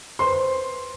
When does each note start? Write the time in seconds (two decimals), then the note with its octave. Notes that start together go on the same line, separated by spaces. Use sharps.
0.19 B4 C5 C6